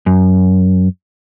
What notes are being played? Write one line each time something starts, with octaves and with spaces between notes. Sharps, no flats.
F#2